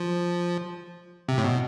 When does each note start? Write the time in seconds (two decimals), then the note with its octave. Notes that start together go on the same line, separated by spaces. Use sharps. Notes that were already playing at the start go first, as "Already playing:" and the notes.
Already playing: F3
1.29 C3
1.38 A2
1.44 B2